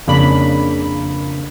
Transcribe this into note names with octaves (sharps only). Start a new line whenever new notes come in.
F2 C#3 A#3 D4 B5